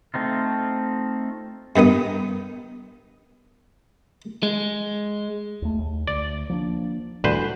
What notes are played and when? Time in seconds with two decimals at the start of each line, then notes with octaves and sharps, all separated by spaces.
0.14 A3 C4 D#4 F4
1.76 G2 D#3 B3 D#6
4.43 G#3
5.62 D#2 A3
5.79 D#2
6.07 D2 D5
6.50 F3 A#3 D4
7.24 D2 A2 D#3 G3 B4 C5